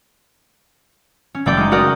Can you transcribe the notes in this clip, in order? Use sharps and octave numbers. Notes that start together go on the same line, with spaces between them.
C#4
F#1 A3 D5 G5 D6
G#3 D#4
F#4 A#4 D5 G5 D#6